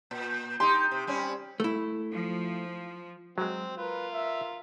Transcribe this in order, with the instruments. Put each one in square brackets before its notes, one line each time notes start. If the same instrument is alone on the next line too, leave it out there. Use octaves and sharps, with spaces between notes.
[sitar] A#2
[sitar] D#4 G4 [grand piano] C6
[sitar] C3
G3 C4 C#4
[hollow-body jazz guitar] A3 E4
[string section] F3
[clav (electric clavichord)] F#3 G#3 [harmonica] C4
[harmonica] F4 A#4 [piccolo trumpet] B4
[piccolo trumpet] E5